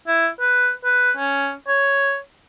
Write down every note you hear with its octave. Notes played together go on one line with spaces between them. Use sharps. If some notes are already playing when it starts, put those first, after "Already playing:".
E4
B4
B4
C#4
C#5